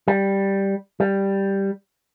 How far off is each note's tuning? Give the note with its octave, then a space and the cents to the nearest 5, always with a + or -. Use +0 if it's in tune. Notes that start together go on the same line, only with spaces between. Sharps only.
G3 +0
G3 +0